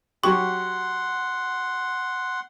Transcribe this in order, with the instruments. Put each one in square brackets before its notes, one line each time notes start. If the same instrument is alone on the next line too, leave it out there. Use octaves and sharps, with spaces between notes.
[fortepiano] F#3 G4 [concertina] F#5 C6 [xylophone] C#6